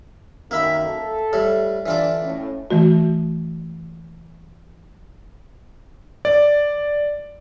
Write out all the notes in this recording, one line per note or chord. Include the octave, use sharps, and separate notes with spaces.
F#2 D#3 A#3 E5 B5
A4
A2 G3
D3 E3 D4 F4 D5
A2 C#4
E3 A3 F#4
D5